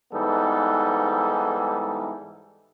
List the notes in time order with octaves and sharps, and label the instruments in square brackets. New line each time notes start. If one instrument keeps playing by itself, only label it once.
[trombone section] G#2 E3 G3 B3 D#4 A4